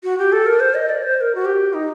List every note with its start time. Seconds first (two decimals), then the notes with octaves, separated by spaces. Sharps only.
0.04 F#4
0.18 G4
0.32 A4
0.46 A#4
0.60 C5
0.75 D#5
0.89 D5
1.03 C5
1.17 C5
1.21 A#4
1.35 F#4
1.45 G4
1.74 D#4